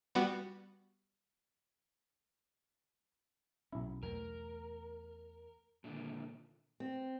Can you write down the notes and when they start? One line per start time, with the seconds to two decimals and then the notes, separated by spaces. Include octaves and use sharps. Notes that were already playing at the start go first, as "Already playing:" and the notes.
0.15 G3 B3 F#4
3.72 B1 C#4 E4
4.03 E2 A3 A#4
5.84 A#2 D3 D#3
6.80 C4